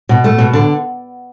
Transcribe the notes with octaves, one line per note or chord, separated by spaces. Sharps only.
B2
A3
B2
D3